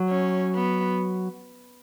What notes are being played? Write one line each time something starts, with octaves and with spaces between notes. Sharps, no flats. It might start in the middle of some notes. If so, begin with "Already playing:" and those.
Already playing: F#3
C#4
B3